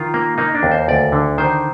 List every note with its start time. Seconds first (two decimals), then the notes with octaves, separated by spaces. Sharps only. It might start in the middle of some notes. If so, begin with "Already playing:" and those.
Already playing: D#3 F4
0.14 A#3
0.38 A#3 D#4
0.55 D4
0.63 D#2
0.72 C5
0.88 D2 D5
1.12 D3
1.38 D#3 C5